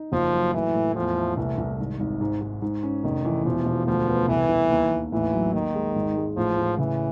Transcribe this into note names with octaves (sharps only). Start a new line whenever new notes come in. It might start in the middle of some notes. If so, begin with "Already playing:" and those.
Already playing: D#4
F#1 F3
F#3
A2 E3
A2
E2 F3
A3
C2 E3
C2
G#1
G#1
G#2
G#2
G#2
C#4
F1 D#3
E3
E1 F3
E1
D2 F3
B3
C2 E3
C2
D#2
D#2
A1 E3
F#3
D#2 D#3
G#3
G#1
G#3
A1 F3
A1
C#3 E3